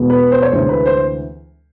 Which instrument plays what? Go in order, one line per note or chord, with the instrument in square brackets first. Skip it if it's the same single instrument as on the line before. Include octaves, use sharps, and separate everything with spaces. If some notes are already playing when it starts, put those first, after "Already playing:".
Already playing: [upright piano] E2 B2 G#3 B3
B4
C5
C#5
D2 C3 E3 G#3 C5
B4
C5